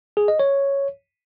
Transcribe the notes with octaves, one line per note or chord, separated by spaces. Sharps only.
G#4
D#5
C#5